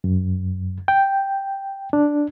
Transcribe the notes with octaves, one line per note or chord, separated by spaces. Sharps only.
F#2
G5
D4